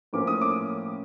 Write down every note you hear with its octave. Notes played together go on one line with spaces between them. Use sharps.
A2 F3 A#3 C#4 D6
D#6
D6